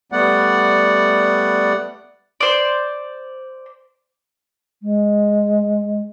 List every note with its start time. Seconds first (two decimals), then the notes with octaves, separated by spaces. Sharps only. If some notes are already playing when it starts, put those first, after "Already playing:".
0.12 G3 A3 B3 D5 F#5
2.41 C5 D5
4.83 G#3